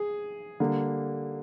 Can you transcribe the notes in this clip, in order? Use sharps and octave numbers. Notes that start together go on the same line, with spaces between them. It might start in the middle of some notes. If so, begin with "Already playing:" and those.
Already playing: G#4
D3 G3 A#3